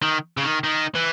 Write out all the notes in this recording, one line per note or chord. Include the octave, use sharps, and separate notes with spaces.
D#3
C#3
D#3
D#3
E3